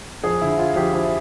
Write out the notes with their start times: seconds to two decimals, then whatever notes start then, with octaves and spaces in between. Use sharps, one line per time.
0.24 F2 G#4
0.41 D3 E4
0.58 F3 F4
0.76 F2 G4
0.93 F3 E4